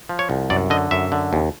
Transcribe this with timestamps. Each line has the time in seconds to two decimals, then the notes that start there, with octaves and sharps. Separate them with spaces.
0.09 F3
0.19 C#5
0.30 C2
0.50 F#2 D5
0.70 D3 D#5
0.91 F#2 E5
1.12 D3
1.33 D#2